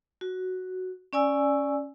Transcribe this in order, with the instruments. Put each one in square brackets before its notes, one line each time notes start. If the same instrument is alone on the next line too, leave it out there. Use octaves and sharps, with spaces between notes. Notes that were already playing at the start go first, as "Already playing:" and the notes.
[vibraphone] F#4
C#4 D5 G#5 E6